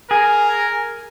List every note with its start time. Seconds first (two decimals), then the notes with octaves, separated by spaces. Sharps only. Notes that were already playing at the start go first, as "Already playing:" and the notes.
0.11 G#4 A#4